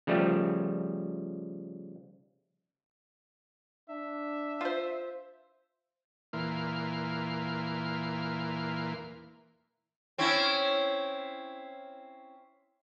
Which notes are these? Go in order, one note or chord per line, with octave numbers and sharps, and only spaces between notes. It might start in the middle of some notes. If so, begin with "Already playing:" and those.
C#3 F3 G3 A3
D4 E5
F4 C5
E2 A#2 E3 A#3 F5 C6
C4 C#4 E4